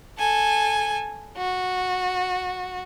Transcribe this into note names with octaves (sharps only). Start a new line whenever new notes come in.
A4 G#5
F#4